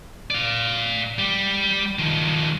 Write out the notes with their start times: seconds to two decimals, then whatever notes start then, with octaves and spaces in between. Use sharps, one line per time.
0.30 D5 F5
1.19 G3
1.99 D#3 F3